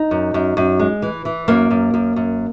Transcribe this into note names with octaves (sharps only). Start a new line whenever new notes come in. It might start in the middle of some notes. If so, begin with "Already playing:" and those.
Already playing: D#4
F#2
F#2
F#2
G#3
E3
E3
F#2 A#3
F#2
F#2
F#2